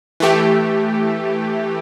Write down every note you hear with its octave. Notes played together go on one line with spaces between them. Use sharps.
E3 A3 G4